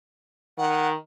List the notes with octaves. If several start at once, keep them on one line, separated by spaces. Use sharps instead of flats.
D#3 F#5